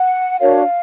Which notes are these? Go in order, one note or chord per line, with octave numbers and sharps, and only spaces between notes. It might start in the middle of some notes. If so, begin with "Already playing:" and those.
Already playing: F#5
D4 F#4 A#4 C#5 F5